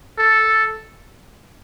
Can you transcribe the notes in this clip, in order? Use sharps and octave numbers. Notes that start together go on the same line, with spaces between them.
A4